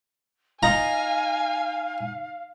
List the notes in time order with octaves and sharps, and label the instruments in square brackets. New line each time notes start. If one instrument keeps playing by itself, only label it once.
[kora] D#4 F4 [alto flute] F5 [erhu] G#5 [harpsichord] A#5